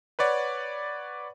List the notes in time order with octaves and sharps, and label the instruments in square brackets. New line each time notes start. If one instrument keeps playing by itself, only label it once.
[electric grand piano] B4 C#5 D5 F#5